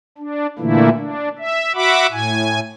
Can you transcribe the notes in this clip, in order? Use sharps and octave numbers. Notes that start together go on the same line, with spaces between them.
D4
A#2 D3 E3 A3 A#3 E4
D4
E5
F#4 E5 F#5 B5 D6
A2 G#5